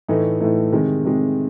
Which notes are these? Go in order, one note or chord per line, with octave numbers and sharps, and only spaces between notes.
A2 E3 A3 D#4
A2 E3 A3 D#4
C3 D#3 G#3
C3 D#3 G#3